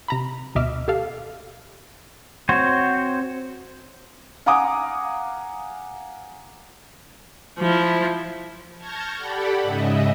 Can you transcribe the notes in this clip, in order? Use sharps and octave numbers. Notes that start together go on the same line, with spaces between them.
C3 A#5 B5
D2 B2 D#5 E5 D6 F6
G4 A4 F5
C4 F#4 C5 C#5
F5 F#5 G#5 A#5 D6 D#6
F3 E4
A5 C#6 F6 G6 G#6 A#6
G4 A4 D5 F#5 B5
G#2 C#3 D#5 E5